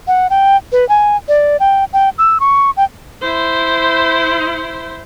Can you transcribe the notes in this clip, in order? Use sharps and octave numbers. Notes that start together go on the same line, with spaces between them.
F#5
G5
B4
G#5
D5
G5
G5
E6
C#6
G5
E4 C5